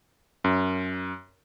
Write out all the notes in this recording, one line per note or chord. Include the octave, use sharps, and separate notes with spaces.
F#2